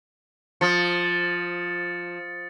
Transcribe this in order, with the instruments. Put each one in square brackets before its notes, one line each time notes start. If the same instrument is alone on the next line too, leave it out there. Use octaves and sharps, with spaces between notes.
[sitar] F3 [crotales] D#6 A6 C#7